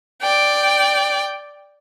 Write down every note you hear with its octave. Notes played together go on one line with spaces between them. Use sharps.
D5 G5